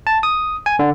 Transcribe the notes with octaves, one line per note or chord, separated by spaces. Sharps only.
A5
D#6
G#5
D3